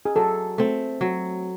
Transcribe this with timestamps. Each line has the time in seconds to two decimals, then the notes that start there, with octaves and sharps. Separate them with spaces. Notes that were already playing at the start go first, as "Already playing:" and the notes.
0.05 G#4
0.16 F#3 A4
0.58 A3 C4
1.01 F#3